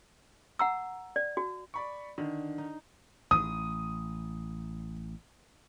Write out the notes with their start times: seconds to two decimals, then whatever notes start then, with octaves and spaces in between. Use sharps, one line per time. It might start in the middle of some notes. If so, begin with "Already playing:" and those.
0.59 F#5 A#5 E6
1.16 D5
1.37 F#4
1.74 D5 B5 C#6
2.18 D3 D#3
2.58 D#4
3.31 A1 D#6